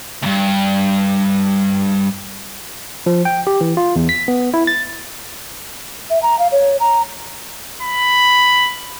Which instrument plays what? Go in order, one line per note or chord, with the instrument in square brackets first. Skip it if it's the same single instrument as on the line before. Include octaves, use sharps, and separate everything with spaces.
[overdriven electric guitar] D2 G2
[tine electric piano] F3
G5
G4
E3
F4
E2
B6
B3
E4
A6
[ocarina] E5
A#5
F5
C#5
A#5
[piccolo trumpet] B5